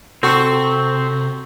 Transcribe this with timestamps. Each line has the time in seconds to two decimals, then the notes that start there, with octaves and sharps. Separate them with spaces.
0.23 C3 C4 F#4 A4 C#6 E6